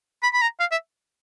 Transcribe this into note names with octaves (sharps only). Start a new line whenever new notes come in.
B5
B5
A#5
F5
E5